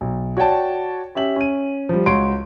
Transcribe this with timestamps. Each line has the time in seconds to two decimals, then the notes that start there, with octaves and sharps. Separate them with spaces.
0.01 B1
0.37 F#4 C#5 D5 G5 A5
1.15 C#4 G4 E5 F#7
1.36 C#4 D#7
1.89 F3 G3
2.06 C#2 F#4 C#5 C6 D7